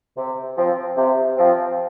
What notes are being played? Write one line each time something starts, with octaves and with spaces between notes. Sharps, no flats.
C3
F3 C4
C3
F3 C4